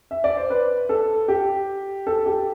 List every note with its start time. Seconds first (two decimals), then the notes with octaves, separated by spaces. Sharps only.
0.11 E5
0.24 D5
0.37 C5
0.50 B4
0.89 A4
1.28 G4
2.07 A4
2.26 G4